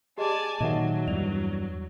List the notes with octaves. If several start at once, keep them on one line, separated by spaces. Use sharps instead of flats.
G4 G#4 D5 D#5 G#5 A5
A#2 D#3 F#3 D#5 E5 F#5
E2 G2 D5 F7